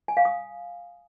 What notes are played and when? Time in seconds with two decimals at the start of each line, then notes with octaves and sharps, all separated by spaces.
0.08 G#5
0.17 F5
0.25 D#6